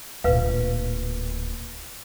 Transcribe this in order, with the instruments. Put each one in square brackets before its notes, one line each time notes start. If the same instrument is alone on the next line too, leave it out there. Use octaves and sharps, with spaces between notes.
[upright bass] D1 A#2 [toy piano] B4 F5